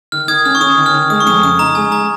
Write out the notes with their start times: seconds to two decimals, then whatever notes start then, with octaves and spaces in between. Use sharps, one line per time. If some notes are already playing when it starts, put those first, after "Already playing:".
0.12 D#3 F6
0.28 D#3 D#6 G#6
0.45 C#4 F6
0.55 C#6
0.61 C#4 D#6
0.77 D#3
0.86 F6
0.94 D#3
1.10 G#3 D#6
1.20 C#6
1.26 F2 D#6
1.43 C#3 D#6
1.59 D#4 A#5
1.75 G#3 G#5
1.92 A#5